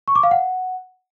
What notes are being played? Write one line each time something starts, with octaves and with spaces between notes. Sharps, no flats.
C#6
D6
F5
F#5